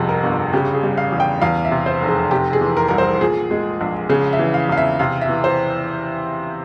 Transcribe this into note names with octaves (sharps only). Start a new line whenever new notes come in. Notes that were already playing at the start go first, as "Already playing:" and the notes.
Already playing: C2 F2 C3 F3 G4 G#4
A#4
G1
C#3 G4
G#4
G3
F5
E2
G5
E2 F5
E5
C3
C5
F1
G#4
C3 G4
G#4
E3
A#4
C2 A#4
C5
A#2 G#4
G#3
A#1
C#3 G#4
E5
E3
F5
E2 F5
E5
C3 F5
E5
E3
C5